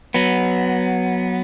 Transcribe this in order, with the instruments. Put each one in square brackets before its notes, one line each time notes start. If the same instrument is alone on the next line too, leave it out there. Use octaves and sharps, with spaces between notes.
[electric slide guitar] F#3 B3